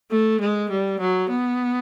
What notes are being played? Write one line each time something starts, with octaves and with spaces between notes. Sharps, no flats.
A3
G#3
G3
F#3
B3